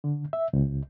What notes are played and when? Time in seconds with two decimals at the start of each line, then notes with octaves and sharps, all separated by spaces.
0.04 D3
0.33 E5
0.53 C#2